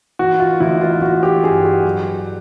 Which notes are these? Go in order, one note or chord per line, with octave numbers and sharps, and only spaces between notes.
E3 F#4
F4
A1 E4
F4
A1 F#4
G4
G2 G#4
F#4
F#3